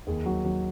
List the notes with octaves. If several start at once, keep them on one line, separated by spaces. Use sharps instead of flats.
D#2 G#4
F#3
F#3